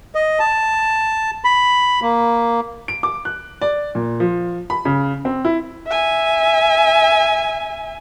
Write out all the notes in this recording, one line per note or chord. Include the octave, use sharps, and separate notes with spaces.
D#5
A5
B5
A#3
D7
D6
F#6
D5
A#2
F3
B5
C#3
C4
E4
E5 G#5